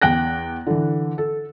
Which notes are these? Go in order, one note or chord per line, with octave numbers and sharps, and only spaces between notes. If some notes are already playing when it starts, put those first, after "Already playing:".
E2 G5 F#6 A#6
D3 E3
A4